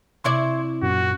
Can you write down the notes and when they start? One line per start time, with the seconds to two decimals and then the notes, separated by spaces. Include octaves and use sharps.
0.24 C3 E4 D5 C6 C#6 G#6
0.82 F#2 A#2 F#4